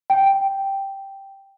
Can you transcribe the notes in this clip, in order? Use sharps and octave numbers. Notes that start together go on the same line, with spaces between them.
G5